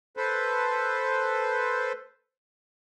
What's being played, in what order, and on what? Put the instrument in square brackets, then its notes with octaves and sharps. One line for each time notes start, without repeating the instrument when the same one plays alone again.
[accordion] A4 B4 C5